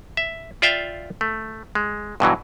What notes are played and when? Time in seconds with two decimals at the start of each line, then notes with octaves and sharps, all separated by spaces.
0.17 E5
0.62 F4 D5 E5 F5 G5
1.21 A3
1.75 G#3
2.20 G2 B2 E3 F#3